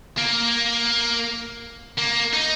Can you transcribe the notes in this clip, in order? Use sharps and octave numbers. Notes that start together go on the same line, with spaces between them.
A#3
A#3
D#4